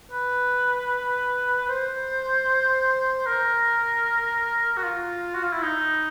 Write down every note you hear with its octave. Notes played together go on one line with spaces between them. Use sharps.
B4
C5
A#4
F#4
F4
F#4
F4
E4
D#4